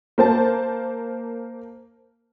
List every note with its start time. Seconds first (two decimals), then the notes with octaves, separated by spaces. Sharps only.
0.18 A#3 C5 A5